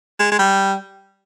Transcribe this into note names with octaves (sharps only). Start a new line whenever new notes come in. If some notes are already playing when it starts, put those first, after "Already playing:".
G#3
G#3
G3